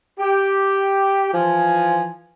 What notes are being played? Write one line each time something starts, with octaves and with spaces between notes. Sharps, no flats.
G4
E3 F3 G#5